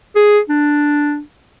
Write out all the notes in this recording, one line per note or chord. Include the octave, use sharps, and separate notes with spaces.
G#4
D4